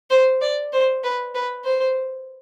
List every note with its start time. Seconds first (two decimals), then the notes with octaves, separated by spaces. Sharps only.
0.10 C5
0.42 D5
0.73 C5
1.04 B4
1.35 B4
1.65 C5